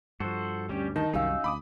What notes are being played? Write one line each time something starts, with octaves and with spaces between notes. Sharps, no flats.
G2 F3 F#4 A4 C5
D2 G2 G3 C#4 G4
D#3 D#4 A5
C2 F#2 G3 C#4 D#4 F#4 F5 E6
D2 B5 D6 D#6